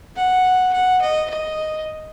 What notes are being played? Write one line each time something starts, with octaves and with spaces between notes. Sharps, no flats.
F#5
F#5
D#5
D#5